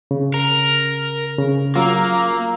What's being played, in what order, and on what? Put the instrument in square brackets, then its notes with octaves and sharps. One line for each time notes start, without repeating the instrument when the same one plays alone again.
[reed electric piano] C#3
[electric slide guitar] A#4
[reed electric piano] C#3
[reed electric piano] F#3 F4 [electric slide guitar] A#3 [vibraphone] F5 A#5 E6